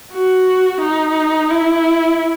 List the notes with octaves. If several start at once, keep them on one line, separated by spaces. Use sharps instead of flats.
F#4
D#4
E4